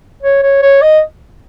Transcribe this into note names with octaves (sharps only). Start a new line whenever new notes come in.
C#5
C#5
C#5
D#5